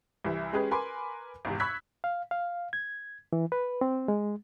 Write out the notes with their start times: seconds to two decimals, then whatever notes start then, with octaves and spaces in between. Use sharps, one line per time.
0.24 C2 E3 E5
0.53 G#3 C#4 G4 G#4 B4
0.71 A#4 B4 G#5 B5 C6 D6
1.45 G#1 E2 C3
1.60 B5 C#6 E6 F#6 G#6 B6
2.04 F5
2.31 F5
2.73 G#6
3.33 E3
3.52 B4
3.81 C4
4.08 G#3